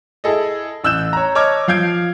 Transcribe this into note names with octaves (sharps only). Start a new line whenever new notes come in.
E4 G#4 A4 D#5
A1 E6 F#6 G6 E7
C#5 A#5
C#5 D#5 A5 D6 F6 G#6
F3 F5 G6 G#6 D7